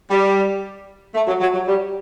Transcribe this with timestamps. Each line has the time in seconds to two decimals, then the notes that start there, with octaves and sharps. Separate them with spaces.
0.11 G3
1.14 A3
1.27 F#3
1.40 F#3
1.53 F#3
1.67 G3